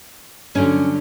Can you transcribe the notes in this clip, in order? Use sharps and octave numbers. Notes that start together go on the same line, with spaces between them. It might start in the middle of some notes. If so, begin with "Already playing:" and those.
G2 D3 F#3 C#4